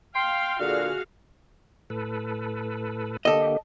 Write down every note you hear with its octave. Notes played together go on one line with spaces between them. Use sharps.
F5 G5 C6
A#2 D3 F#4 G#4 F5
A2 A4 B4
D3 A#3 G4 A4 D#5